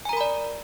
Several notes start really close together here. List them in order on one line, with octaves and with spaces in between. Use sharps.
G#5 A#5 A#4 B5 D5